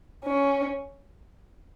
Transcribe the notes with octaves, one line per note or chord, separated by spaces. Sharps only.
C#4